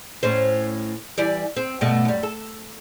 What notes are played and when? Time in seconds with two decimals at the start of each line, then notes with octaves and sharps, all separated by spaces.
0.23 A2 C#4 C5
1.18 E3 G3 D5
1.57 C4
1.81 G2 B2 A3
2.05 F#2 G3
2.23 A4